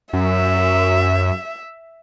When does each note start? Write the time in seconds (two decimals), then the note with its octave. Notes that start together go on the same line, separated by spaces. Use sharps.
0.13 F#2 E5